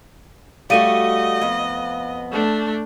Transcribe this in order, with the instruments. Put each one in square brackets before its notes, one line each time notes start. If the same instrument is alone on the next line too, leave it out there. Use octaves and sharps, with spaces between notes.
[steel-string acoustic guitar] G3 A3 F#4 [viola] D#5 [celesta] F5 D#7
[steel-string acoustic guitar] F2 B3
[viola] A3 D4